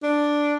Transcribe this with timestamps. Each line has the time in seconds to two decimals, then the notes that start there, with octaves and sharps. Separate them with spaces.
0.03 D4